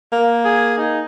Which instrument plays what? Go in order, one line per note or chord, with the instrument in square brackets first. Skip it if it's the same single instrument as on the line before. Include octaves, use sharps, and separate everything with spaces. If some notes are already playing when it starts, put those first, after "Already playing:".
[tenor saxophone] A#3
[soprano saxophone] G#4
D#4